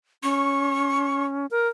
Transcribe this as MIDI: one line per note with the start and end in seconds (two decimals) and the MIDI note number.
0.23 1.46 61
0.23 1.25 85
1.51 1.68 70